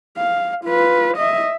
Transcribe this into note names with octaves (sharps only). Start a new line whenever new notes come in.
F5
F4 B4
D#5 E5